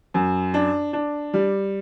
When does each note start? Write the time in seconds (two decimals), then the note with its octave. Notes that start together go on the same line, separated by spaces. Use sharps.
0.14 F#2
0.54 D4
0.93 D4
1.34 G3